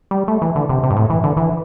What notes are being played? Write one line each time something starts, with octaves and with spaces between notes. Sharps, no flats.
G3
A3
E3
D3
C3
C3
G2
A2
E3
D3
E3